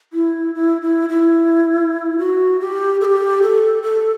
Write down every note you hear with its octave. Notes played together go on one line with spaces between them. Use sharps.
E4
E4
E4
E4
F#4
G4
A4
G4
A4
A4